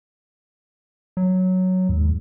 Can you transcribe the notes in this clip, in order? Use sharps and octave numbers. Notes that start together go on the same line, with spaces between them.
F#3
D#2 G#2